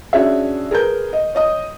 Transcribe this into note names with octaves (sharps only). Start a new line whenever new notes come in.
C#4 D4 F#4 G#4 C#5 E5
G#4 A#4 B4 G6
D#5
C#5 D#5 D#6